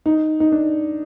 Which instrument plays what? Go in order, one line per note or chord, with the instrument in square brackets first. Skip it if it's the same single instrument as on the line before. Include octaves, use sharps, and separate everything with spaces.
[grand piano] D#4
D#4
D4